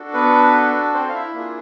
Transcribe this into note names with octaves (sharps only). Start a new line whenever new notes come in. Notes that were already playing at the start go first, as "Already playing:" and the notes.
Already playing: D4 F#4 A4
B3 B4
C4 C5
F5
E4 E5
A#3 D4 F4 G#4